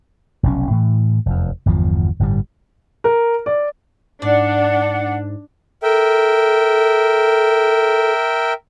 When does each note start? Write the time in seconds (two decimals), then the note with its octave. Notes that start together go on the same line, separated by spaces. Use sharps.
0.43 F1 B1 C#4
0.71 A2 E3
1.26 F1 E2
1.66 G1 E2 D3 F3
2.19 G1 A2 C#3 G3
3.04 A#4
3.46 D5
4.22 G#2 D4 D5 F#5
5.83 A4 A#4 E5 G5